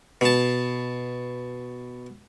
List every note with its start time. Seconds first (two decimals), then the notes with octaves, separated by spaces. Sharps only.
0.21 B2 A5